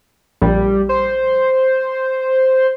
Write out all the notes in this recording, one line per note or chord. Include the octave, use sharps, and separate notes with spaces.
A#1 G3
C5